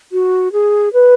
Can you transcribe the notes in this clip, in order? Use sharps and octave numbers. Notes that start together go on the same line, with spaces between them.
F#4
G#4
B4